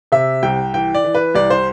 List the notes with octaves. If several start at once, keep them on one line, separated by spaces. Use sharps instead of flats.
C3 E5
C2 G5
E3 G5
D5
E3
B4
C2 D5
C5